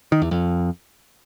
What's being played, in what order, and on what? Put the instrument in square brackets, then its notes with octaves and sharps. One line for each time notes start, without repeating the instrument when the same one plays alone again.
[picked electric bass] D#3
E2
F2